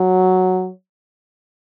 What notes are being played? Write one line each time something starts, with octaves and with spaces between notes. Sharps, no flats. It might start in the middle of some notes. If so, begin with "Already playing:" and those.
Already playing: F#3